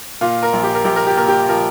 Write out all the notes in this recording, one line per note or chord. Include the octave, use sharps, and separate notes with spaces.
A#2 F4
A#4
A#1
G4
A#4
A#1 G4
A#4
G4
A#2 A#4
G4
F3 A#4